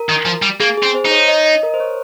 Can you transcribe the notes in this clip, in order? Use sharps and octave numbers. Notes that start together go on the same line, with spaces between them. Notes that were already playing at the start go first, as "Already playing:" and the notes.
Already playing: A#4
D#3
F3
G3
A#3 G#4
G#4
C4
C5
D#4
C#5
D#5
D#5
A#4
C5
C#5